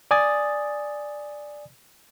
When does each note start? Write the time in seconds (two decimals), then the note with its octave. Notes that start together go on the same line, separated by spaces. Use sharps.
0.11 D5 G#5 D#6 A6